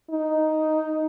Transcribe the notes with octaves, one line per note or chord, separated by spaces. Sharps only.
D#4